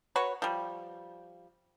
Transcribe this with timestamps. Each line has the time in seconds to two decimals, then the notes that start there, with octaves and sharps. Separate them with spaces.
0.16 F#4 B4 C#5
0.42 F3 G3